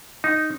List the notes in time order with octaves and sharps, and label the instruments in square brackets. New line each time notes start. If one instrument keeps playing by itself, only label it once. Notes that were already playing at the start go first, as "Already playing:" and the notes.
[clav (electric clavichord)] D#4